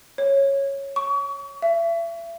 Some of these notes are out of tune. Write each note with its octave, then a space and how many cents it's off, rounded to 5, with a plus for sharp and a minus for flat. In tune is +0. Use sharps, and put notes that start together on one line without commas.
C#5 -10
C#6 +35
E5 +35